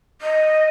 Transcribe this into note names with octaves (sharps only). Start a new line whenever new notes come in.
D#5